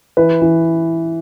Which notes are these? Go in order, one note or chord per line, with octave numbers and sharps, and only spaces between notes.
E3 B4
E3